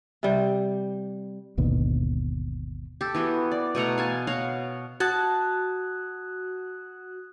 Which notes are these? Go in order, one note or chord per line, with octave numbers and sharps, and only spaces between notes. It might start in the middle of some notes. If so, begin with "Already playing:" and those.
C3 G3
G#1 D#2 B2 D3
G4 A4
E3 B3 F#4 G5
D5
B2 A3 F#5 A#5
F5 G#5 A5
F#4 C#5 F5 F#5
F#4 A5 D#6 F#6 G#6